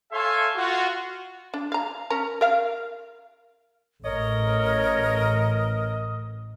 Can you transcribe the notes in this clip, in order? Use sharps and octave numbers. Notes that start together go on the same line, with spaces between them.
A4 C#5 E5 F5 G#5 C6
F4 F#4
D4
F5 A#5
C#4 A#4 A#5
A#4 F5
A1 A#4 C#5 D#5